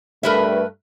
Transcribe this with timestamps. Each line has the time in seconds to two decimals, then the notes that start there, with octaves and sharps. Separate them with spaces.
0.23 G2 A3 A#4 B4 E5